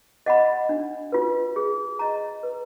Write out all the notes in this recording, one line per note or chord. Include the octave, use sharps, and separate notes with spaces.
D#5 F#5 B5
D4
F4 B4
G#4
D#5 A#5
B4